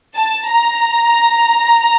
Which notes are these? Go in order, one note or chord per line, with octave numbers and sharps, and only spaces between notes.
A5
A#5